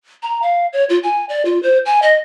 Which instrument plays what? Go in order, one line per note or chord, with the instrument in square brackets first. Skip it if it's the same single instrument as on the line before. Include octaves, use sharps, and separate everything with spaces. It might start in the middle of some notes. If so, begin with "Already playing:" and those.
[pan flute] A#5
F5
C#5
F4
G#5
D5
F4
C5
G#5
D#5